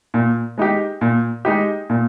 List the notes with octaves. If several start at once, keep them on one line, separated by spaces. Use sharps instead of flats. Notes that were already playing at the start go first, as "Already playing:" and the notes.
A#2
G#3 D#4 G4
A#2
G#3 D#4 G4
A#2